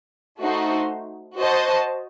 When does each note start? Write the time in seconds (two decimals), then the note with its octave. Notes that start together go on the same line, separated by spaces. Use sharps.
0.40 A3 D#4 F#4 C5
1.38 F#4 C5 D#5 A5